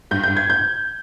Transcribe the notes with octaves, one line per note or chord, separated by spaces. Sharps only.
G2 G6
G2 G6
G#6
G6